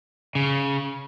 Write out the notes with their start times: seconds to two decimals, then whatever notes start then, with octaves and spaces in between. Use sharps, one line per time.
0.35 C#3